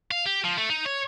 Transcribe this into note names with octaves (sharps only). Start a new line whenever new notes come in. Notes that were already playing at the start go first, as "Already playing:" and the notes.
F5
G4
F3
A3
D#4
C#5